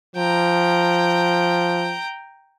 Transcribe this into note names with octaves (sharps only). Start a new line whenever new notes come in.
F3 G5 A#5